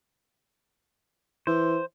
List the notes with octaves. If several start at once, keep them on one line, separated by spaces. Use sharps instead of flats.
E3 C5